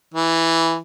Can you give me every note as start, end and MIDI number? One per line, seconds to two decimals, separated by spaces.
0.14 0.79 52